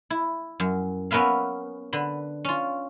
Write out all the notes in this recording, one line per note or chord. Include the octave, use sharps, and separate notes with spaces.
E4
F#2
B3 C#4 A#4 B4 E5 F5
D3 B4
C#4 F4